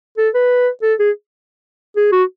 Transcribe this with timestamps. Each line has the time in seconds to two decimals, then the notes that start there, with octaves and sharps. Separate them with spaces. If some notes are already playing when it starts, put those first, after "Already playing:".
0.18 A4
0.34 B4
0.83 A4
0.99 G#4
1.97 G#4
2.12 F#4